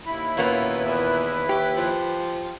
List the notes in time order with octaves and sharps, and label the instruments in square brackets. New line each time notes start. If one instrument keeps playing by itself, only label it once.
[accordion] D#2 E4 B5
[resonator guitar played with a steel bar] A#2 A#3 B3 [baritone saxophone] C#4 [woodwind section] B4
[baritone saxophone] E2
[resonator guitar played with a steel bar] G4
[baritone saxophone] F3